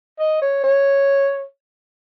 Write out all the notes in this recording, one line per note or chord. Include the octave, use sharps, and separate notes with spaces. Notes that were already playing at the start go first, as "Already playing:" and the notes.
D#5
C#5
C#5